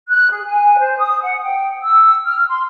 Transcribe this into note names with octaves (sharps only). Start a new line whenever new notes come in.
F#6
G#4
G#5
C5
D#6
F#5
G5
E6
F6
C6